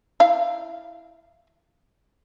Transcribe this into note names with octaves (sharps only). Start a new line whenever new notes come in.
E4 F5